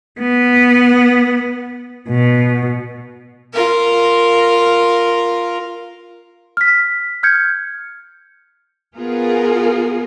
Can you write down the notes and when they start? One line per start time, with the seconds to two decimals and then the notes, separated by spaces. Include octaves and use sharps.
0.19 B3
2.09 B2
3.53 F4 A#4
6.57 F6 B6
7.23 F6 G6 G#6 C#7
8.97 B3 F4 G#4 A#4